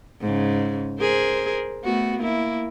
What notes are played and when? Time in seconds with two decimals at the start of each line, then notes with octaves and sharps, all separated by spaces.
0.21 G#2 C#3
0.99 G#4 A#4 C5
1.84 A3 B3 F#4
2.18 A#3 E4